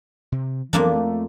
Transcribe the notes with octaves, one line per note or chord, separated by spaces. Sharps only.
C3
F2 E3 F#3 A#3 B3 D4
A3